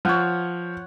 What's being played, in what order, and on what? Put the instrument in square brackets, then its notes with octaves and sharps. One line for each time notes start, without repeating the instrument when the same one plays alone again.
[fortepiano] F3 [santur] C#5 F#5